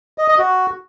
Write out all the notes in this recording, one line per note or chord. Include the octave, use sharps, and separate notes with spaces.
D#5
D#5
F#4